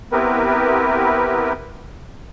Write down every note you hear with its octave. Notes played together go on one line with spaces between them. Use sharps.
B3 C4 E4 G4 A#4 B4